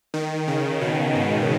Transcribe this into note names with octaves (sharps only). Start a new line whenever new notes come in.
D#3
C#3
B2
G#2